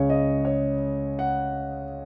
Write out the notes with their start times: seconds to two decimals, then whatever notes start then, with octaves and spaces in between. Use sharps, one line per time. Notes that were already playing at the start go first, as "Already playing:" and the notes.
Already playing: C#2 C#3 G#3 C#5
0.09 D#5
0.45 C#5
1.19 F#5